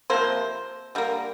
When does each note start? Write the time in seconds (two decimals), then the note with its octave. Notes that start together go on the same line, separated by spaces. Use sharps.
0.10 C3 F3 A#3 C5
0.95 D3 G3 A#3